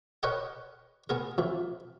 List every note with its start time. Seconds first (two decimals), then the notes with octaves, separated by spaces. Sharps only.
0.23 A#4 B4 C#5 D#5 F#5 G5
1.09 B3 G#4 A#4
1.38 F2 E3